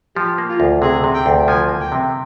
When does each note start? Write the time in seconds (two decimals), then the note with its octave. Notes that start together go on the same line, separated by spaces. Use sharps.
0.16 F3 G4
0.38 A#3
0.50 F4
0.60 D2
0.82 C3 G#4
1.04 C3
1.15 G5
1.26 D2
1.48 F3 G#5
1.69 A#3
1.81 G5
1.92 C3